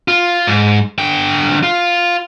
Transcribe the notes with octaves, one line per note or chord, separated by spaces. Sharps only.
F4
G#2
D3 G5
F4 F5